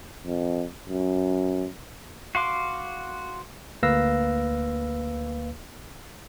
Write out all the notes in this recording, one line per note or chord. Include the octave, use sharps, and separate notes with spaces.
F2
F#2
F#4 F5 C6 D6
D2 A#3 B4 F5 E6 A#6